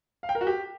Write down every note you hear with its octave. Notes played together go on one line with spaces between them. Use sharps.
F5
G5
A#4
F#4
G4